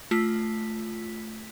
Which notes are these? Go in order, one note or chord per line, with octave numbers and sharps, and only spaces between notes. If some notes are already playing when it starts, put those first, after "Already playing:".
A3 F4 B6